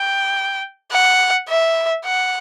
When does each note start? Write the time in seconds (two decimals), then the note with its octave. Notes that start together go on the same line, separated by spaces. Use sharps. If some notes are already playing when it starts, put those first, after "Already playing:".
Already playing: G5
0.92 F#5
1.49 E5
2.05 F#5